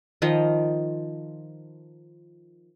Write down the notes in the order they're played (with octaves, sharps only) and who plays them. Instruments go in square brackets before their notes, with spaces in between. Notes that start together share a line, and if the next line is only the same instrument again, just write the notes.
[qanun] D#3 F3 D#5